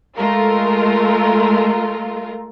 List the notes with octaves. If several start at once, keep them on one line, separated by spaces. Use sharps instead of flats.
G#3 A3 F4 A#4